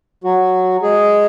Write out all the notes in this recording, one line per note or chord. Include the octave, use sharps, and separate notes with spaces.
F#3 F#4
G#3 G#4